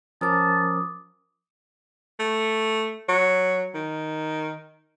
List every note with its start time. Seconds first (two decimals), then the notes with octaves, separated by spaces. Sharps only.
0.21 F3 C#4 A#4 A5 D6 D#6
2.19 A3
3.09 F#3
3.75 D#3